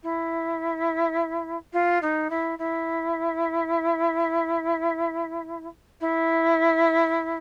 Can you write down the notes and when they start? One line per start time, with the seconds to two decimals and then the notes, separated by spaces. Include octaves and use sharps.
0.03 E4
1.73 F4
2.02 D#4
2.30 E4
2.58 E4
6.00 E4